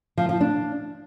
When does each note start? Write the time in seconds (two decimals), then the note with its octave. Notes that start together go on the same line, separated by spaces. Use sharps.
0.18 F3
0.29 F3
0.41 D4